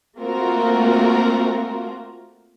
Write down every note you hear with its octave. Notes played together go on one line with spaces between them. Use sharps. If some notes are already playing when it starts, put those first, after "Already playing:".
A3 A#3 C4 F4 F#4 A#4